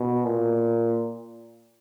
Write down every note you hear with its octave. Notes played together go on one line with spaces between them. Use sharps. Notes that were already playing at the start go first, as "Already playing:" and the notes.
Already playing: B2
A#2